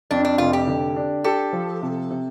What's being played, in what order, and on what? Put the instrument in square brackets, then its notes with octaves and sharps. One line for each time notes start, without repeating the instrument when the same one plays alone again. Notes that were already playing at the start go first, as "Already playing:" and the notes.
[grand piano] F2 [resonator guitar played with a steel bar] D4
[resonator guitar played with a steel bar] D4
[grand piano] F1 [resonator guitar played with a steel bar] F4
[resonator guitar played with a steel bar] G4
[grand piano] D3
D4
[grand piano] G4 [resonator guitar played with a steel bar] A4
[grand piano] F3
C3
C3